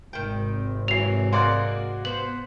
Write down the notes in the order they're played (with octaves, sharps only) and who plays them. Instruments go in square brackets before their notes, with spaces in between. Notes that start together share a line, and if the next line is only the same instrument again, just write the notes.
[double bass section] G#1 C3 [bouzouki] D#3 G5
[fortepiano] E3 F#3 [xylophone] C7 F7
[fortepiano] G#3 D5 F#5 [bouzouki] A#3 F#4 [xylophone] C6
[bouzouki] B3 C5 [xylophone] F#7